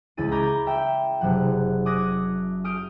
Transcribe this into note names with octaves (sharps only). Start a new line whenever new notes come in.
C#2 C#4 E4 A6 D#7
A#5 B5 D6 G6 G#6 A#6
E5 G5 E6 G6
F#1 C3 F#3 F#5
D6 D#6 F#6 G#6 A#6 C#7
D#6 F6 G6 D7